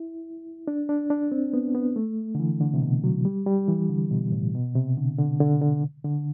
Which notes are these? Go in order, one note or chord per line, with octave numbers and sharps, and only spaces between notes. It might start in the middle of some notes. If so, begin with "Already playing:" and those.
Already playing: E4
D4
D4
D4
C4
B3
B3
A3
D3
E3
D3
C3
B2
F#3
G3
G3
E3
D3
B2
A2
B2
C3
D3
D3
D3
D3
D3